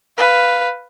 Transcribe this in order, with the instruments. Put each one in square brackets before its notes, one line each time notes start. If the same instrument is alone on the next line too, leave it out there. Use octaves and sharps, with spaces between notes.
[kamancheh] B4 F5